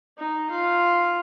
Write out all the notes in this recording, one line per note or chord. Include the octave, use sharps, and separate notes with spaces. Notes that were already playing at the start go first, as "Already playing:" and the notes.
D#4
F4